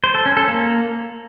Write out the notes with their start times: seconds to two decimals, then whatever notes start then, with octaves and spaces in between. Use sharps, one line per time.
0.04 C5
0.15 A4
0.26 C#4
0.37 A4
0.48 A#3